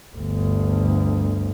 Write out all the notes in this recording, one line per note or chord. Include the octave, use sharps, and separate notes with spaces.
G1 D2